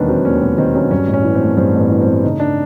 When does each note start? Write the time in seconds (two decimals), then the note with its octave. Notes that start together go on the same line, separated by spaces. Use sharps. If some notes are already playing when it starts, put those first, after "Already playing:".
Already playing: E1 D#2 D#3 B3 C#4 D4
0.08 F#3 C4
0.25 D#2 C#4
0.42 E1 B3
0.58 D#3 C4
0.75 F#3 C#4
0.91 G2 C#4
1.07 A1
1.14 C#4
1.24 E3
1.35 C4
1.41 A3
1.57 G2 C4
1.74 A1 B3
1.91 E3
2.02 C4
2.07 A3
2.23 C#3 D#4
2.40 D4